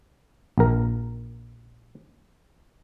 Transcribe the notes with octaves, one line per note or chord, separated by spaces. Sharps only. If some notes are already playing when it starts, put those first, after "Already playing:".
A#1 A#4